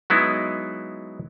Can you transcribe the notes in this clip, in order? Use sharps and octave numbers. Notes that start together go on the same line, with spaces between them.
F#3 G#3 B3 D#4 E4